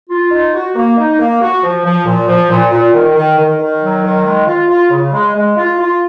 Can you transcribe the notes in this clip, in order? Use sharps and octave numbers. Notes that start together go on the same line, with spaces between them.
F4
D#4
F#4
A#3
D#4
A#3
F#4
F3
F3
A#2
F3
A#2
A#2
D#3
D#3
D#3
D#3
F#3
D#3
G#3
F4
F4
C#3
G#3
G#3
F4
F4